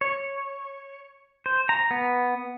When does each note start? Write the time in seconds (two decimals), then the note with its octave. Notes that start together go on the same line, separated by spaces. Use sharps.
0.01 C#5
1.46 C5
1.69 A#5
1.91 B3